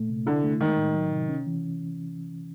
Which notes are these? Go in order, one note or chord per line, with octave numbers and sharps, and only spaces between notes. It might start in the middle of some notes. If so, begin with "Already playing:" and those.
Already playing: A#2 A3
C3
D3 E4
A3
D#3 G#3
A2
F#3
C3
C#4
E3